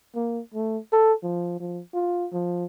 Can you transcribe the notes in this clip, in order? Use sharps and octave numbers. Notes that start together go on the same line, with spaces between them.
A#3
A3
A4
F3
F3
F4
F3